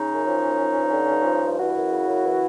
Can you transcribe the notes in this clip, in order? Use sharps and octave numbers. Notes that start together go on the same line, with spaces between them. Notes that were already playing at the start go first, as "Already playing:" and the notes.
Already playing: C#3 C#4 D#4
F#2
F3
F#2
F3
G2
D3
G2
F3
G2
E3 E4 F#4
F#2
C#3
F#2
E3